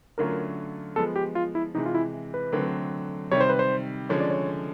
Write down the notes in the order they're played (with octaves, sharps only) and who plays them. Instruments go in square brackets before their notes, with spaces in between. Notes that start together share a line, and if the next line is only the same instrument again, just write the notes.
[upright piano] D3 F#3 A3 C#4 F4 [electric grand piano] A#4
[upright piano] F3 G#3 B3 [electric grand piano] A4
[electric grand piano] G4
F4
E4
[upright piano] C3 E3 G#3 [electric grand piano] D#4
[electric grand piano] F4
E4
B4
[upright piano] D3 F#3 A3 C4
[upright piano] C3 D#3 G3 [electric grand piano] C#5
[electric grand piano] C5
B4
C5
[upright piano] D3 F3 G#3 C#4 [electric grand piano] C#5
[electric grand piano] D5
C#5